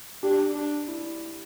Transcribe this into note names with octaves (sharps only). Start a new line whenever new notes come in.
D4 G4
D4
E4